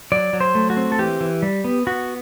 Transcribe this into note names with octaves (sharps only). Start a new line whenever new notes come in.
F#3 D5
F#3
C5
A3
F#4
C4
A4
E3 G4
E3
G3
B3
B3 F#4